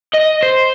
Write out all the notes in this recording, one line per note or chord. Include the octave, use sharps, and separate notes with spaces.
D#5
C5